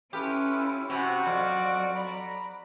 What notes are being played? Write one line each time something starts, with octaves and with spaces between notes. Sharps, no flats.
C#4 E4 F4 G4 A4 B4
C3 F#4 G#5 B5
F2 F#3 F4 D5
A#5 B5